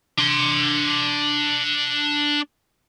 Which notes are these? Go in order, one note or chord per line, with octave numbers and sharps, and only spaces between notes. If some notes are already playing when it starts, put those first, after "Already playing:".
D4 C6